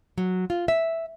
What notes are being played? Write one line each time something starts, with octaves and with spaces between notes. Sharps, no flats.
F#3
F4
E5